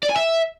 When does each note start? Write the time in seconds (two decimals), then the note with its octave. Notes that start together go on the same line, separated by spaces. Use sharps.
0.03 D5
0.09 G#5
0.16 E5